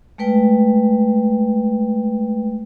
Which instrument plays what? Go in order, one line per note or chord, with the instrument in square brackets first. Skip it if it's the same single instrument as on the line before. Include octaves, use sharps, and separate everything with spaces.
[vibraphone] G#3 A3 B4 G5